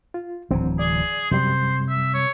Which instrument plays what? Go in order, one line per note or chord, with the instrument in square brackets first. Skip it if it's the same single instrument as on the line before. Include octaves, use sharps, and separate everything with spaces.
[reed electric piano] F4
[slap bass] D1 E3 F#3 [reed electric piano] D3 C4
[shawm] G#4 [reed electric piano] D5
[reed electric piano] F#2 G3 [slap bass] C3 [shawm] C5
[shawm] E5
C#5